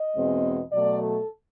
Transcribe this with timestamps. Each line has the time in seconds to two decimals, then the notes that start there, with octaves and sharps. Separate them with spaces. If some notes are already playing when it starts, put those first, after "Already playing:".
Already playing: D#5
0.16 E2 B2 G#3 C4
0.72 B2 F#3 A3 D5
1.01 A4